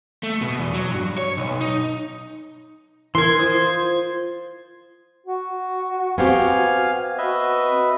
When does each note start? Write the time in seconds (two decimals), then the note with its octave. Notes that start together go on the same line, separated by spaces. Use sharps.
0.23 A3
0.42 B2
0.59 E2
0.73 F#3
0.92 G2
1.18 C#5
1.37 B1
1.61 D#4
3.15 E3 A#4 C6 G#6
3.39 F4 C5 D#6
5.27 F#4
6.18 B3 C4 G4 F5 G#5
7.18 F#4 B4 D#5 E5